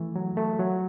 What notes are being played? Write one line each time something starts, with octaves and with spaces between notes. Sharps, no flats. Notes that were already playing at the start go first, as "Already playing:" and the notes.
Already playing: E3 A3
F#3
A3
F#3